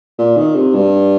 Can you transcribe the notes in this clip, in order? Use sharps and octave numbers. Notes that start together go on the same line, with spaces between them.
A#2
D#3
C3
G2